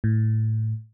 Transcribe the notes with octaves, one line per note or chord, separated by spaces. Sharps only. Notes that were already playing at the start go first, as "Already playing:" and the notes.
A2